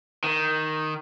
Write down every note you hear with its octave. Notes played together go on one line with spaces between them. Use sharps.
D#3